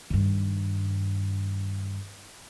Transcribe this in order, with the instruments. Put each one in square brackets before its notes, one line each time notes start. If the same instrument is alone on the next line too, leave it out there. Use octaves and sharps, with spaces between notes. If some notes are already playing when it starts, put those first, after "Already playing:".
[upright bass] G2 D#3